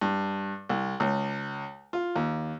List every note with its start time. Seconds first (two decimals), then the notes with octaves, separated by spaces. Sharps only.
0.01 G2
0.69 C2
1.00 C#2
1.93 F4
2.16 D#2